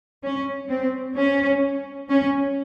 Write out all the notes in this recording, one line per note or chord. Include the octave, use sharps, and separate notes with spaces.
C#4
C4
C#4
C#4